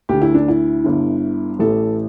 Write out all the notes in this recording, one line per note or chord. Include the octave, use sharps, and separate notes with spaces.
D2 D3 G4
E4
D4
E4
G1 G2 D3
A1 A2 E3 A4